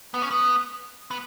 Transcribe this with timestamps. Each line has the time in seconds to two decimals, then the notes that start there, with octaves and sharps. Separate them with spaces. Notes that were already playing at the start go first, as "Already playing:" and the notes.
0.14 B3
0.22 C#4
0.31 B3
1.11 B3